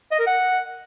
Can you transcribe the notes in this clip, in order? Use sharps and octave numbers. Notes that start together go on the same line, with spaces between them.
D#5
A#4
F#5